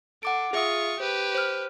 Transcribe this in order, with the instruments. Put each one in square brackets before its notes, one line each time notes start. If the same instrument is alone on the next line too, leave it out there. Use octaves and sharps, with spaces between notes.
[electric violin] A4 [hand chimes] F#5 D6 D7
[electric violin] F4 C#6 [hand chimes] G#4 E5 D#6
[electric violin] G4 B4 [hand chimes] C5
[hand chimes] C5 F6